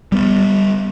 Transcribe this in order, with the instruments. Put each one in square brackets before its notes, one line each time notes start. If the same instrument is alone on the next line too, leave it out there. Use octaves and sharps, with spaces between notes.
[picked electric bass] G3 A#3 B3